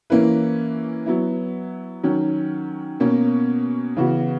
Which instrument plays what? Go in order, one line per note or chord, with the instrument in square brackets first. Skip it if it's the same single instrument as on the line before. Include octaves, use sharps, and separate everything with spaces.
[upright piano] E3 A#3 C#4 E4 B4
F#3 B3 E4
D#3 F#3 C#4
B2 A#3 C#4
C#3 E3 B3 F#4